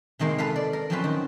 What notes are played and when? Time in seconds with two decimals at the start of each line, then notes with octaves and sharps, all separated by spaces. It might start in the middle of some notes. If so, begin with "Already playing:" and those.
0.19 C3 D#3 G#3 A#3
0.38 A4 B4 F5
0.56 D5
0.73 A#4
0.90 F3 F#3 C4 C#4 F4 B4
1.04 D#3